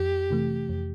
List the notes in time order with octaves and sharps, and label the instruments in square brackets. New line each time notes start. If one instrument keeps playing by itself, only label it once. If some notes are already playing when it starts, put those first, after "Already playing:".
Already playing: [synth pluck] F2 [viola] G4
[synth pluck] C3 E3 A3
F2